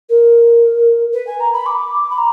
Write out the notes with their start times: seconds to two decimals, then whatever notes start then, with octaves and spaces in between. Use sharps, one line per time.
0.09 A#4
1.13 B4
1.26 G#5
1.40 A#5
1.53 B5
1.66 D6
2.10 B5
2.17 A#5